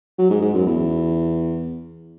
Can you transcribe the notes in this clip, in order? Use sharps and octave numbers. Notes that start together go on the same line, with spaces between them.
F#3
G#2
G#2
F#2
E2